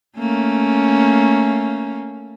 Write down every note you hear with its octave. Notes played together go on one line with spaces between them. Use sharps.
A3 A#3 C#4